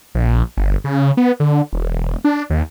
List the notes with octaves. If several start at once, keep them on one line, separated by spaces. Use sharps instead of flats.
A#1
G1
C#3
B3
D3
E1
D4
D#2